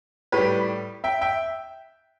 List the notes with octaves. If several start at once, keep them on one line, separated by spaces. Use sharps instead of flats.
A2 G3 G4 B4
E5 G5
E5 G5